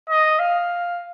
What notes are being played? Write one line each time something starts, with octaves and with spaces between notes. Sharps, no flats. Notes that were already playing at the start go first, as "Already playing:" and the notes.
D#5
F5